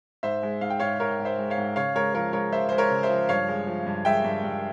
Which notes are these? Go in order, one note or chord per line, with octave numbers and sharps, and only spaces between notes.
G#2 C5 E5
G#3
G#2 F5
G5
G#2 C#5 F5
G#2 A#4 C#5
G#2
C5 E5
G#3
C#5 F5
G#2
C#3 C#5 F5
G#3 A#4 C#5
F3 A#4 C#5
G#3 A#4 C#5
F3 C5 E5
G#3 C5
A#4 C#5
C#3
C5 E5
F3
G2 C#5 F5
G#3
F3
G2
G#3 E5 G5
G2
G2